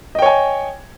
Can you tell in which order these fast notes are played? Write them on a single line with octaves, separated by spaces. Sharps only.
D#5 G5 C#5 G#5